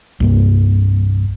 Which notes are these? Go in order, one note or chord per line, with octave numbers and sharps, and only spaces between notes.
C2 G2 A#3